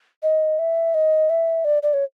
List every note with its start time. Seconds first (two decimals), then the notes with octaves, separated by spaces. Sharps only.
0.23 D#5
0.59 E5
0.94 D#5
1.30 E5
1.65 D5
1.83 D5
1.94 C#5